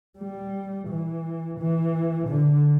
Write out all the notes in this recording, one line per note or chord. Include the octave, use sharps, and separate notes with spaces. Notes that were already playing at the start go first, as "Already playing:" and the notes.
G3
E3
E3
D3